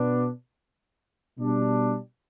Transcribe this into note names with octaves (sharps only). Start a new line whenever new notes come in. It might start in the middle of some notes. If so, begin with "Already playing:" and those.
Already playing: B2 B3 D4
B2 G3 D4